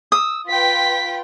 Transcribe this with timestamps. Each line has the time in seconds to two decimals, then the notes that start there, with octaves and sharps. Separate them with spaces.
0.12 D#6 E6
0.47 F4 B4 G5 B6